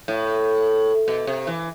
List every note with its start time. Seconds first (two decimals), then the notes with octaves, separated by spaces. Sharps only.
0.08 A2
1.08 B2
1.27 C3
1.47 E3